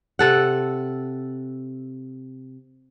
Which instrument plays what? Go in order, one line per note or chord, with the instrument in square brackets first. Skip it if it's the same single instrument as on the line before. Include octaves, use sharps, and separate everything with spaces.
[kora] C3 A4 F#5